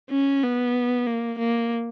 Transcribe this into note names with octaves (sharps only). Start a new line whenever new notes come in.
C#4
B3
A#3
A#3